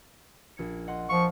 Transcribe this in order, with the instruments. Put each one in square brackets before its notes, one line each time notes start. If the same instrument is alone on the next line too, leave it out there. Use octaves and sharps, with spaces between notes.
[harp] A#1 G#6 C#7
D#5 F#5 C6
[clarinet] F3 [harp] F5 [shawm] C#6